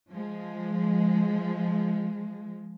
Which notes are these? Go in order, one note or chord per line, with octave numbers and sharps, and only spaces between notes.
F3 G#3